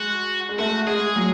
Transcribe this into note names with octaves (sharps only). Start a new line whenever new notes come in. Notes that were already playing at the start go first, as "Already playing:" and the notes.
Already playing: G#3 F#4
G#3
A3 F#4
G#3 G#4
F#3